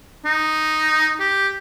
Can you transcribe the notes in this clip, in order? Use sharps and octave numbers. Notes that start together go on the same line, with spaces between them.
D#4
G4